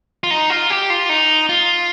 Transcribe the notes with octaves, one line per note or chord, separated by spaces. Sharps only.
F4
D#4
F4
G4
F4
D#4
F4